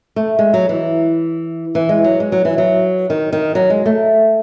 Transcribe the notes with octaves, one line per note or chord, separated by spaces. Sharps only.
A3
G#3
F#3
E3
E3
G#3
F#3
G#3
F#3
E3
F#3
D#3
D#3
F#3
G#3
A3